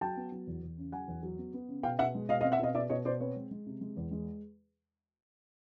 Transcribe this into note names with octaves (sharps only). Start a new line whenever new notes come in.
F#3 G5 A5
B3
F#3
E2
E2
C#3
F#3 F#5 G#5
E2
F#3
B3
B3
C#3
B2 F5 G5
B2 E5 F#5
G#3
B2 D#5 F5
D#5 F5
C4
E5 F#5
B2 D#5 F5
B2 D5 E5
B2 C#5 D#5
B2 C5 D5
C4 B4 C#5
G#3
G#3
C3
G#3
E2
G#3